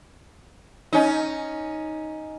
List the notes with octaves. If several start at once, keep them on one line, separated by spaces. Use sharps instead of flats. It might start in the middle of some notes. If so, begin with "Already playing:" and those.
C#4 D#4